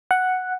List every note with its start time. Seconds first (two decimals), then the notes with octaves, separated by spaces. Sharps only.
0.11 F#5